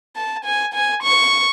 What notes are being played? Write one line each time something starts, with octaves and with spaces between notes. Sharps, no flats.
A5
G#5
G#5
C#6